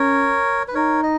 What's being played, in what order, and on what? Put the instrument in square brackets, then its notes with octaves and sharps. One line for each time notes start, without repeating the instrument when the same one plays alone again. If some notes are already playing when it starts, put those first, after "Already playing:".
Already playing: [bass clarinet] C#4 [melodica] A#4 C#5
[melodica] B4
[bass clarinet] D#4 [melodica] A#4 C#5
[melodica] D#5